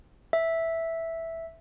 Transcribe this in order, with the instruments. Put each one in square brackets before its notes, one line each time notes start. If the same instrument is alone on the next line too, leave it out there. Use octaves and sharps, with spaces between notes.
[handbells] E5